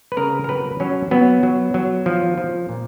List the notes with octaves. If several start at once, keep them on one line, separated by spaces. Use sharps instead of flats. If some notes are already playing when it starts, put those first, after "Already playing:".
B4
C#3 A#4
A#4
F#3 B4
F#3 C#4
F#3 B3
F#3
F#3
F3
F3
A#2